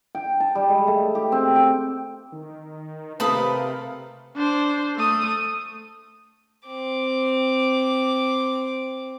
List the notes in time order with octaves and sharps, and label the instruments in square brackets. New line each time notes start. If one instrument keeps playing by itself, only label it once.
[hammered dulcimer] G5
A5
G3
G#3
A3
G4
C4
G5
[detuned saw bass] D#3
[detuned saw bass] C3 [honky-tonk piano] A3 A#4 F5 [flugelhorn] B4 [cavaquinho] A5 B5 D#6
[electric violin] D4 C5
A3 D#6
[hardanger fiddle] C4 D6